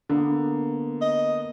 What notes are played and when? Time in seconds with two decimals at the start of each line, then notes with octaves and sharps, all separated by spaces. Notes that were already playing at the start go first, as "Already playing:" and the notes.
0.09 D3 A#3 B3
1.01 D#5